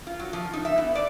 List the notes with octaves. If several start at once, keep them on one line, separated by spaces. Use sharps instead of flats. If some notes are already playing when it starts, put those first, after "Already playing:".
F4
F#3
F3
D#4
E5
B3
D5